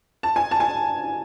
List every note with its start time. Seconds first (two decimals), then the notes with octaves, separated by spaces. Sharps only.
0.23 A5
0.36 G#5
0.51 A5
0.60 G#5